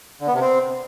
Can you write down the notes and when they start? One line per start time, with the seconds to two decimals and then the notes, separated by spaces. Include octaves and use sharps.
0.21 D3
0.27 B3
0.34 C3
0.41 C4